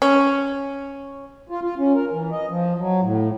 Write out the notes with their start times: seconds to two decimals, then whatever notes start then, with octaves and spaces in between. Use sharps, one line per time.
0.02 C#4
1.49 F4
1.63 F4
1.78 C#4
1.94 A#4
2.11 E3
2.31 D#5
2.48 F3
2.78 F#3
3.02 A2